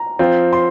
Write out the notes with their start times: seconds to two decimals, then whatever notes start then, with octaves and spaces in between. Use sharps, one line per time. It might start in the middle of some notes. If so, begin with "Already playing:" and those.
Already playing: A#5
0.19 F3 C4 F4
0.53 C6